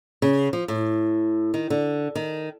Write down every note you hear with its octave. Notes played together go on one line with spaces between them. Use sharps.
C#3
F3
A2
D#3
D3
D#3